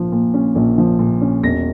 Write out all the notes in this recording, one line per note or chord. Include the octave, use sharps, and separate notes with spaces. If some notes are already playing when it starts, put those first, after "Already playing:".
Already playing: A#1 A#2 F3
A#2
C#4
A#1
F3
A#2
C#4
E1 A#6